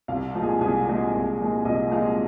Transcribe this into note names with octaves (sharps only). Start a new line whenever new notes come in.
C2 F5
A#2 F3 G#3
G#4
C2 G#4
A#2 F3 G#3
C2
A#2 F3 G#3
C2 D#5
A#2 F3 G#3 F5